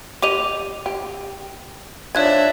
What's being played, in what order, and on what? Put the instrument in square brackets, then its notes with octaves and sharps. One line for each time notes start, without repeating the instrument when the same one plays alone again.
[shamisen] G4 D#5 [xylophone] D6 D#7 F7
[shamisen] G4
[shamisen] D#3 F3 [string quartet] D4 E5 [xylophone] C#5 F#6 G#6